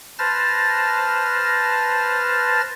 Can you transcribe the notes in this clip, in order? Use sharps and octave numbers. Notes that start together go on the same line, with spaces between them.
B4 C5 A5 F6 A6 A#6